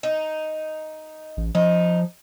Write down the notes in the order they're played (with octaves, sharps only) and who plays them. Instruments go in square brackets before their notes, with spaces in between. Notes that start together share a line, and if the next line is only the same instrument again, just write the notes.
[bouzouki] D#4
[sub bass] A1
[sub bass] F3 [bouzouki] D#4